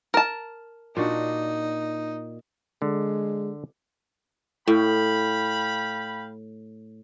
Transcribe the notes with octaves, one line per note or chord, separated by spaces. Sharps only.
A#4 A5
A#2 D4 D#4 F#4
D3 G#3
A2 F5 G5 B5